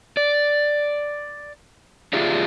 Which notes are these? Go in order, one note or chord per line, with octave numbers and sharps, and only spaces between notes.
D5
F4 G4 G#4 D5 E5 F5